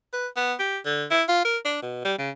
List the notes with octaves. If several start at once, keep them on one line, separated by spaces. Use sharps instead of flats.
B4
B3
G4
D3
E4
F4
A#4
D4
B2
G3
C#3